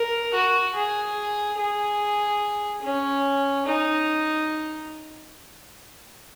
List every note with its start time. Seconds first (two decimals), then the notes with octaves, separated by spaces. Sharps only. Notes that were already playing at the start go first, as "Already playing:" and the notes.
Already playing: A#4
0.34 F#4
0.75 G#4
1.58 G#4
2.82 C#4
3.67 D#4